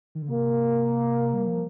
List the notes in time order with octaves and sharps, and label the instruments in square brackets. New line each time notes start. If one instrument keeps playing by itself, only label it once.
[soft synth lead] D#3
D3
[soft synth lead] C3 [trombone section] A#3
[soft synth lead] G3
F3